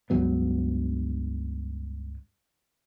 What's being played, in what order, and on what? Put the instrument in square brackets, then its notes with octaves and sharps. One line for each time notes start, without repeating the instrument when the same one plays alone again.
[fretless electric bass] C#2 G2 F#3 B3